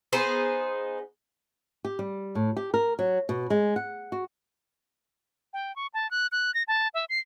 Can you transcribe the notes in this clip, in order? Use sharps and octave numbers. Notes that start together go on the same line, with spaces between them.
B3 D#4 G#4 C5
G4
G3
A2
G4
A#4
F#3
B2
G#3
F#5
F#4
G5
C#6
A5
F#6
F#6
A#6
A5
E5
C7